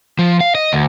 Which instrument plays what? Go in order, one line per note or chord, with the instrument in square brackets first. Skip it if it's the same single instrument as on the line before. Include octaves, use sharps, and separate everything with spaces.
[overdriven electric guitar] F3
F5
D#5
D2